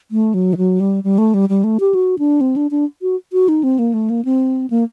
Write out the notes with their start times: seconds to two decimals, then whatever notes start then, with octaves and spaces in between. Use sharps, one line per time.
0.11 A3
0.34 F#3
0.53 D#3
0.57 F#3
0.80 G3
1.04 G3
1.18 A3
1.34 G3
1.49 G3
1.64 A3
1.80 G4
1.95 F#4
2.19 D4
2.41 C4
2.56 D4
2.71 D4
3.02 F#4
3.33 F#4
3.48 D#4
3.63 C4
3.79 A#3
3.94 A3
4.10 A#3
4.25 C4
4.70 A#3